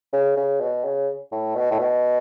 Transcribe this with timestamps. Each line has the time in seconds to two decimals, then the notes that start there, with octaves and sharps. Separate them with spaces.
0.13 C#3
0.37 C#3
0.61 B2
0.84 C#3
1.32 A2
1.55 B2
1.71 A2
1.79 B2